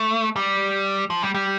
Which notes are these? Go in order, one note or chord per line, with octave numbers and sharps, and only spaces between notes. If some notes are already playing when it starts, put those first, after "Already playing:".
Already playing: A3
G3
F3
G3
G3